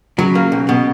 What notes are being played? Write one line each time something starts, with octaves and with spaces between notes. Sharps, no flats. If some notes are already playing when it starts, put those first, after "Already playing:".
C#3 F#3
A#3
B1
B2